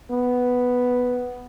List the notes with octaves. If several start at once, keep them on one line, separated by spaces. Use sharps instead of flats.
B3